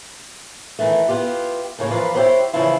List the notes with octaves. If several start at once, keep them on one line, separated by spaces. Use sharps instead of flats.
D#3 E3 A3
B3 F4 G4
A2 C#3 A#3 C#5
E3 F3 F4 A#4 B4 D5
E4 G4 G#4 C5 C#5 F#5
C#3 E3 F3 E4 F4